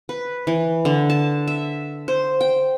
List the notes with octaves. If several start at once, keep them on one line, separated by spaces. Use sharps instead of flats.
B4
E3
D3
A5
E5
C5
G5